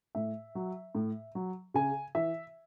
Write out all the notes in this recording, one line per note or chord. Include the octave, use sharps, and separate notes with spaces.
A2 E5
F#3
A2
F#3
C#3 G#5
E3 E5